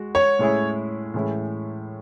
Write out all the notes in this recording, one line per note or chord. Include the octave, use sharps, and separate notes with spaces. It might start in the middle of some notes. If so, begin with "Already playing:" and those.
Already playing: G#3 F#4
C#5
A2 G#3 C#4 E4 G#4
A2 E3 G#3 C#4 E4